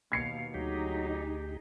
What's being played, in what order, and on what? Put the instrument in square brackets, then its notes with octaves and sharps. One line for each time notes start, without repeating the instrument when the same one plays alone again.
[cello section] D#2 B2 F5 [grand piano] G#6 C7 C#7
[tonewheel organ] D2 G4 [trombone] F#3 [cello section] D#4 G#4